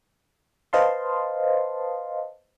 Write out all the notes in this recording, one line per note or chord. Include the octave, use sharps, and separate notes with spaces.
B4 C5 D#5 F5 A5 C6